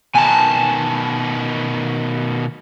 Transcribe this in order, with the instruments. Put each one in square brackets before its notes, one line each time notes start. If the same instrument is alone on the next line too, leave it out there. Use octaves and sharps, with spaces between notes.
[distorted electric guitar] B2 D#3 [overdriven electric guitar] G#5 A5